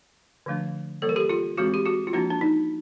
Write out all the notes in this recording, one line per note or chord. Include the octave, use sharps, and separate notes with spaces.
D3 F3 A3 D4
E3 G3 A#3 A4
A#4
G4 A4
F4 G4
E3 G#3 C4 F#4 G#4
G4
F#4 G#4
F4
F3 A#3 D4 E4 F#4
D4
D#4